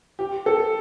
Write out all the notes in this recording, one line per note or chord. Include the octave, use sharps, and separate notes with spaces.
G4
A4